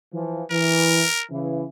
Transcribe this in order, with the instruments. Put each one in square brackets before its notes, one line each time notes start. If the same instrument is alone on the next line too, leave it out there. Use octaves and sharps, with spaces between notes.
[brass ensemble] E3 F3
[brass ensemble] E3 [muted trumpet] A#4
[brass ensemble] C#3 E3